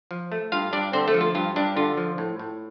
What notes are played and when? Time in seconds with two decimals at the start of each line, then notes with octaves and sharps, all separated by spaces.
0.11 F3
0.32 A3
0.52 G2 F4 F5
0.73 G2 D4 D5
0.93 D3 C4 C5
1.08 A3 A4
1.14 F3
1.21 F4
1.35 G2 F4
1.56 G2 D4
1.76 D3 F4
1.97 F3
2.18 A2
2.39 A2